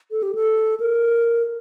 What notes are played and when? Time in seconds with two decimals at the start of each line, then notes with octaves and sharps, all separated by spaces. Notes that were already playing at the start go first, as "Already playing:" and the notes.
0.11 A4
0.23 G4
0.35 A4
0.80 A#4